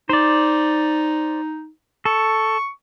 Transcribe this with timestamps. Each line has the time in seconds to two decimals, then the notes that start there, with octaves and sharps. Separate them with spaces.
0.09 D#4 C5 D5
2.05 A4 C#6